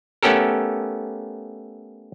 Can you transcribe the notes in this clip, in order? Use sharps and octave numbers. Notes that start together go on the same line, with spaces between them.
A3 B3 C#4 G4 A4 A#4